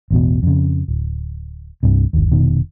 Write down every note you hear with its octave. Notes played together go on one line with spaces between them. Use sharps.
A1 E2 B2
F2 C#3
D1
C2 G2 C3
G1 D#2
F1 B2 D#3